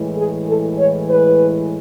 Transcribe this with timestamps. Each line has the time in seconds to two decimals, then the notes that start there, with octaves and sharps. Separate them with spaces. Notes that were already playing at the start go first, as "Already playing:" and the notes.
Already playing: A2 E3 G#3
0.17 G#4
0.47 A4
0.79 C#5
1.09 B4